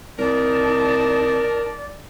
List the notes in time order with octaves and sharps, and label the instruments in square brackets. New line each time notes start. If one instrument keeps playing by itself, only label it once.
[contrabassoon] C2 [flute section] D#4 A5 [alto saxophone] A#4 [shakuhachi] D5